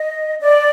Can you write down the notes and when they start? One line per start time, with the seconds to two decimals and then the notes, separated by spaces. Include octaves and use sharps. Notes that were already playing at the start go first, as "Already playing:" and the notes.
Already playing: D#5
0.40 D5